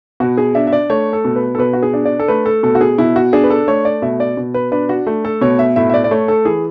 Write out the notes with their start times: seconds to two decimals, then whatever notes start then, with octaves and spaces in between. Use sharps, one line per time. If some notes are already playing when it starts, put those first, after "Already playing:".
0.20 B2 F#4
0.38 G#4
0.55 D4 E5
0.67 E5
0.73 D5
0.90 A3 C#5
1.13 A4
1.25 B2
1.36 B4
1.55 A4
1.59 B2 B4
1.73 F#4
1.83 G#4
1.94 D4
2.05 D5
2.19 A4
2.28 A3 B4
2.46 A4
2.63 B2 A4
2.75 F#4
2.81 G#4
2.98 B2 E4
3.16 F#4
3.33 D4 G#4
3.44 B4
3.50 A4
3.68 A3 C#5
3.85 D5
4.02 B2 E5
4.20 D5
4.37 B2
4.54 B4
4.72 D4 B4
4.89 F#4
5.07 A3
5.25 A4
5.41 B2 C#5
5.59 E5
5.76 A2 E5
5.90 E5
5.94 D5
6.04 D5
6.11 A3 C#5
6.28 A4
6.45 E3 G#4